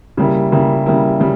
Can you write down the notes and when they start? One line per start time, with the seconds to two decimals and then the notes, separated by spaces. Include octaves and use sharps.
0.17 C#3 G3 A#3 E4
0.52 C#3 G3 A#3 E4
0.86 C#3 G3 A#3 E4
1.20 C#3 G3